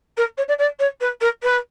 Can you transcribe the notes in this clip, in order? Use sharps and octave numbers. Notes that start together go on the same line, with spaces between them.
A#4
C#5
D5
D5
C#5
B4
A#4
B4